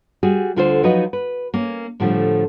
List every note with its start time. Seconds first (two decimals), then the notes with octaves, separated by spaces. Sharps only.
0.23 G3 F#4 G#4
0.56 D2 D3 F4 A4 A#4 C5
0.83 F3 F#3 D#4 F#4 B4 D#5
1.13 B4
1.54 A#3 C#4
2.00 A2 D3 F3 G3 A3